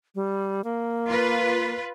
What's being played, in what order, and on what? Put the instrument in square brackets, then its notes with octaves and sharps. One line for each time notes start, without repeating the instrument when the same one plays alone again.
[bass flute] G3
A#3
[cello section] F4 B4